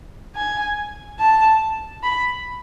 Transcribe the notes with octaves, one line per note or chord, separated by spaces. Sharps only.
G#5
A5
B5